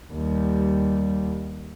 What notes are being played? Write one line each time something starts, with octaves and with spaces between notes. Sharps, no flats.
D#2 G3